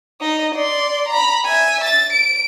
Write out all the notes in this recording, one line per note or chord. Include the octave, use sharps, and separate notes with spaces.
D#4 D#5
D5 C6
A#5 B5
E5 G#5
A6
D7